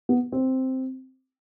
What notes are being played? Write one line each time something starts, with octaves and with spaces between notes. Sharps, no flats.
B3
C4